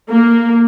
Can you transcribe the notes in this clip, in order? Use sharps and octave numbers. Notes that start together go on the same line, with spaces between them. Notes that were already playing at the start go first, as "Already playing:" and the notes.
A#3